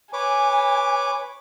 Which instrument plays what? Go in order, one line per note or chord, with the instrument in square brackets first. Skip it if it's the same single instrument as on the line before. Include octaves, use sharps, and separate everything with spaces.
[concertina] B4 C#5 D6 [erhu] G#5